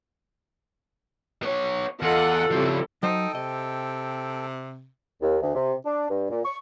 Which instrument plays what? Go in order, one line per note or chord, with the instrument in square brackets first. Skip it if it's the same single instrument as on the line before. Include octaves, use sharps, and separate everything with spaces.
[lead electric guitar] B3 C#5
[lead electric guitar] E2 [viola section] F4 D#5 F#5 [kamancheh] A4
[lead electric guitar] C#3 F3 [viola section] G3 C4 E4
[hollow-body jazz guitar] F#3 C5 [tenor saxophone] D#4 [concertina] A4 G5
[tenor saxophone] C3 [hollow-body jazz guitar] D#5
[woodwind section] D#2
D2
C3
D4
G2
A#2
C#6